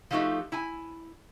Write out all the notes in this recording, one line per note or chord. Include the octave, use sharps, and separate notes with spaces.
F3 G#3 A3 D#4 F#4 G4
E4 G#5